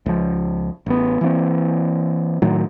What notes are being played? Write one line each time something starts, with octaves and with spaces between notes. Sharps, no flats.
C#2 F3
A1 B3
E3 A#3 C4
A2 D#3 F#3